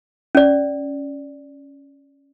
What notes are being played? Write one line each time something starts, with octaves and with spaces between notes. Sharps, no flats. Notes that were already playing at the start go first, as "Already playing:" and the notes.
C#4 D5